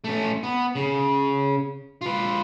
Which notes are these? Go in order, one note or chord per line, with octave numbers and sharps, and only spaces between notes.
A3 C#4
B3
C#3
F4 B4